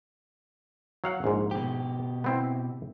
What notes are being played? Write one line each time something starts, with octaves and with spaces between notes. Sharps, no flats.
F#3 F5 F#5
A#1 G#2
B2 G4
B3 C4 E4